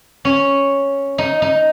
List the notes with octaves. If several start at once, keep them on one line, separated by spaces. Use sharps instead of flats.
C#4
D#4
D#4